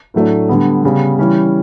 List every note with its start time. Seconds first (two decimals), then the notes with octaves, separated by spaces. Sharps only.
0.14 A2 F#3 A3 D4
0.49 D3 G3 B3
0.83 C#3 G3 B3
1.19 E3 G3 C#4